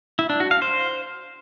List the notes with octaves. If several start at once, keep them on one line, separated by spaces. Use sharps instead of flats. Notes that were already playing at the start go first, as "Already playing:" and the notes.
E4
D4
F#4
F5
C5